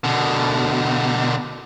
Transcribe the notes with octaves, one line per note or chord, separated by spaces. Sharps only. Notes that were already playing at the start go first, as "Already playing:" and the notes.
B2 D3